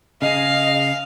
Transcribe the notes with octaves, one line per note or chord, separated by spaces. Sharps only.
C#3 G#4 D#5 F5